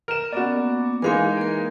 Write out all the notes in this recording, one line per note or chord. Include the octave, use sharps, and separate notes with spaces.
A#4 E7
A#3 B3 C#4 F#4 D5
E3 G#3 D#4 A#4 F5 G#5
A#3 A#4